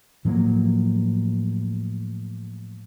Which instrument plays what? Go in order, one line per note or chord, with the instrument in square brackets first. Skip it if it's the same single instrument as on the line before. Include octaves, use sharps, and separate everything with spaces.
[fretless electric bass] A2 F3 F#3 A#3